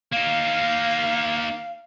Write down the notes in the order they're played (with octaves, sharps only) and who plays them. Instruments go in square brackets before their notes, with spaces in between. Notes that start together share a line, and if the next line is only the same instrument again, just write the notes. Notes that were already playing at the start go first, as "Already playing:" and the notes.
[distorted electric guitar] A#3 D#4 [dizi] F5